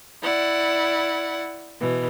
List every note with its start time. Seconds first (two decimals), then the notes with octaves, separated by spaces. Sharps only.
0.22 E4 D5 F#5
1.78 B2 E3